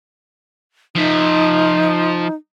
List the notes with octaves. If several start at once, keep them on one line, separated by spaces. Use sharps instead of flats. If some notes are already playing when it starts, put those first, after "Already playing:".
F3 D#4 E5